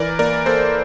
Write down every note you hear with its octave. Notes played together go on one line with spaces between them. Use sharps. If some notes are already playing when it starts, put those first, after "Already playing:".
Already playing: E3 A#4 D5
A#3 A#4 D5
A#3 A4 C5